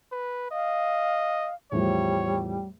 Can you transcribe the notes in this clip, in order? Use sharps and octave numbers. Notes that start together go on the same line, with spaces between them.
B4
D#5 F5
E2 A2 F3 G3 C#5